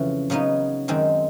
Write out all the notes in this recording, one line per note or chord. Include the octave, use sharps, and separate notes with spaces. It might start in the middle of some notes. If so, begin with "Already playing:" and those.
Already playing: F2 C#3 E3
C#3 F#3 B3 D#4
F#2 D#3 G#3 C4